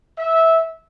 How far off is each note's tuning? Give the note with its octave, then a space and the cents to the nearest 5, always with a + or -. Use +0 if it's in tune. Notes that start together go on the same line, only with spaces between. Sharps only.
E5 -15